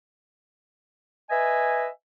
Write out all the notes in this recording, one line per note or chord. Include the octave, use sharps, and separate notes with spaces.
B4 D#5 E5 G#5